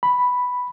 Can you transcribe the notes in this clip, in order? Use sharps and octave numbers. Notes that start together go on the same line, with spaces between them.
B5